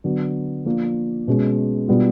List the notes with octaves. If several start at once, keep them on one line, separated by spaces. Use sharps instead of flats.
D3 F#3 B3 D4
F3 A#3 D4 F4
B2 G#3 C#4
B2 G3 B3 D4 F4